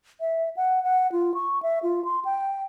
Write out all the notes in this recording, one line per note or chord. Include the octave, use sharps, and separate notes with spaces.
E5
F#5
F#5
F4
C#6
E5
F4
C6
G5